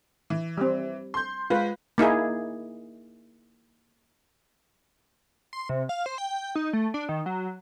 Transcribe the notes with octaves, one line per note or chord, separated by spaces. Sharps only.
E3
G3 C4
C6 G6
G#3 F4 B4
A#3 D#4 E4 G#4
C6
C3
F5
C5
G5
D#4
A3
D4
D#3
F#3